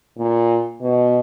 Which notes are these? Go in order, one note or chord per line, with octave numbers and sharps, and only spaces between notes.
A#2
B2